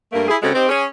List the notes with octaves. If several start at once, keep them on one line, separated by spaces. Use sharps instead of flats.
G2 A3 A#3
E4 G#4
C#3 G#3 C4 F#4 A4
C4 D#4 G4 C5
C#4 G#4